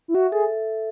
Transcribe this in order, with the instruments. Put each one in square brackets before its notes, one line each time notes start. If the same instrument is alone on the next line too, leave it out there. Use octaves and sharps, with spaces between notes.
[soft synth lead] E4
[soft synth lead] F#4 [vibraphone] E5
[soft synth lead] G#4 [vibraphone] A4